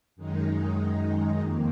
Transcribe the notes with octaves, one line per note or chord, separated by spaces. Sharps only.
F#2 D#3 G#3 D#4
F2 D#3 A#3